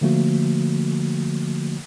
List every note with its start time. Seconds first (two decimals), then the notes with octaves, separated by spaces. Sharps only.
0.01 D3 F3 A3 A#3 F#4